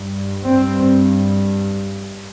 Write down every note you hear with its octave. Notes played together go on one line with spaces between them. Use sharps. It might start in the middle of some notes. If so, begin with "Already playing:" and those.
Already playing: G2
C4